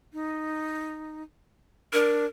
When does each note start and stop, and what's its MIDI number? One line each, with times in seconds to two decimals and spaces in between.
0.13 1.23 63
1.93 2.25 62
1.93 2.26 70